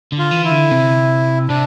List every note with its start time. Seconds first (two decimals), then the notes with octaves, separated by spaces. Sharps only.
0.12 D3
0.19 F4
0.31 E3
0.45 E4
0.51 D3
0.71 C3
1.49 C3 D4